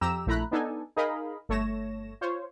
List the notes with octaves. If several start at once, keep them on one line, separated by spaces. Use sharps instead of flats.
F2 G4 A#5 E6 E7
A#1 A3 E4 A#5 B5 F#6
B3 D4 D#4 A4 G#5
D#4 G#4 A#4 D#5 F5 B5
G1 A3 C#5 A#6 E7
F4 C5 C#5